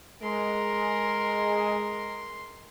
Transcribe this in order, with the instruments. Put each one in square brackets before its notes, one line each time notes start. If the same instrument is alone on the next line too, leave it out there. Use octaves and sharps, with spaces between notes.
[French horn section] G#3 [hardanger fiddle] A#4 [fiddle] C6